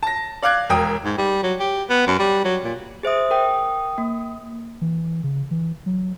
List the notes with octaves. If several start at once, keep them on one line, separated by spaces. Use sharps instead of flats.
A5 A#6
D5 F5 D6 F#6 G#6
E1 A#4 G5 D#6
G#2
G3
F#3
G4
B3
F#2
G3
F#3
A#2
G#4 C5 E5 D#6
A#4 G5 D#6
A#3
E3
C#3
E3
F#3